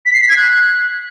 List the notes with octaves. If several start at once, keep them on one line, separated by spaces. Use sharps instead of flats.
B6
C7
B6
G#6
F#6